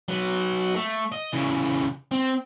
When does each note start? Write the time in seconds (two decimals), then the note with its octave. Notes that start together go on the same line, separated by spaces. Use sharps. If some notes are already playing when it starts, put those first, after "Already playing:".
0.09 F#3 B4
0.76 A3
1.12 D#5
1.33 C#3 E3
2.12 C4